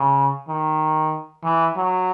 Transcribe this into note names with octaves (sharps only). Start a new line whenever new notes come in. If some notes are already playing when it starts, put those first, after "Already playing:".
Already playing: C#3
D#3
E3
F#3